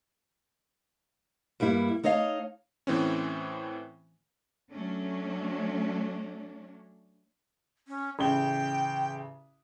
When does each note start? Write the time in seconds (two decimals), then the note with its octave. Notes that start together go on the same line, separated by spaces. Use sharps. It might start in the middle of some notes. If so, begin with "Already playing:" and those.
1.60 G2 G3 A#3 E4
2.04 A3 D#4 C#5 D#5 F5
2.87 A2 E3 C4 C#4
4.71 F#3 A3 C#4 D4
7.88 C#4
8.19 A1 C#3 G5 G7